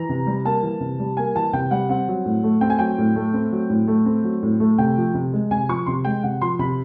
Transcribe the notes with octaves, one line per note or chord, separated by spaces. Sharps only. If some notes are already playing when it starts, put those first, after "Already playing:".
Already playing: E3 A#5
C3
G3
A#3 A5
E3
C3
G3
A#3 G#5
E3 A5
C3 G5
G3 F#5
C4 F#5
F#3
A2
A3
C4 G5
G#5
F#3 G5
A2
A3
C4
F#3
A2
A3
C4
F#3
A2
A3
C3 G5
F3
C3
G#3
C3 G#5
F3 C#6
C3 C6
G#3 G5
C3 F#5
F3 C6
C3 B5